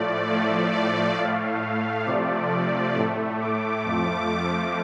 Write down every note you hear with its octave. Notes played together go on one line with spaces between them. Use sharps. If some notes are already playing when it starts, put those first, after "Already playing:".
Already playing: A2 F3 A3 D5
A2 F3 A3 D5
D5
A2 A3 F5
C3 F3 A3 D5
A2 A3
D6
F2 F3 A3